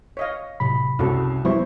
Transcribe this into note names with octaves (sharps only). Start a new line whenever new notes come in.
C#5 D#5 F5
A2 C3 F#3 B5
C2 F#2 C#3 C#4 F#4 A4
F#3 G3 B3 E4 C5 C#6